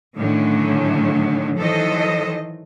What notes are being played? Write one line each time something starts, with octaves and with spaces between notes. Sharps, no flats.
A2 D3 D#3 F#3 A3 C#4
D#3 E3 F#3 A4 C5 D#5